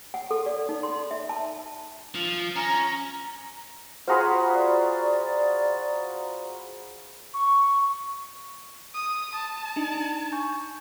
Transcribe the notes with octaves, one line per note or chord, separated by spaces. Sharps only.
F#5
A4
D5
D#4
C6
E5
A5
F3
C#4 A#5
F4 F#4 G#4 C5 A#5 B5
D5
C#6
D#6
A5
D4 D#4
G#5 C#6 G6